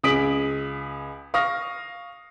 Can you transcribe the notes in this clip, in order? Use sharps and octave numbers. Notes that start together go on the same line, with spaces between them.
C#2 G#4 D#6 B6 D7 F#7
F5 C#6 D#6 F6 A#6